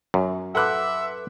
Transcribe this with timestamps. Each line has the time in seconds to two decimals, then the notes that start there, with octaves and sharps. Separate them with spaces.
0.14 F#2
0.55 A4 B4 E5 F#5 C6 D6 F#6